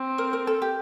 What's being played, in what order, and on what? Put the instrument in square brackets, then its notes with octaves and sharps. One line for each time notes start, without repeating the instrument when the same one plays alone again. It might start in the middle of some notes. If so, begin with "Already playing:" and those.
Already playing: [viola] C4
[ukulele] A#4
A#4
A4
G4